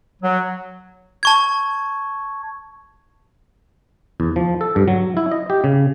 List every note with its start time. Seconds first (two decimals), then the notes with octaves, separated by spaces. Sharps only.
0.22 F#3
1.23 A5 C#6 G#6
4.20 E2
4.36 F3
4.61 A4
4.76 G2
4.88 F#3
5.17 E4
5.32 D#5
5.50 G4
5.64 C#3